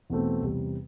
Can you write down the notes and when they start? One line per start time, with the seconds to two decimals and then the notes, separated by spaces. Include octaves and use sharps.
0.10 E2 B2 A3 C4
0.42 E2 C3 G3